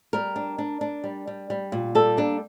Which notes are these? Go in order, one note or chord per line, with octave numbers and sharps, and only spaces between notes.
G3 A#4
D4
D4
D4
G3
G3
G3
A#2
G3 A4
A#3 D4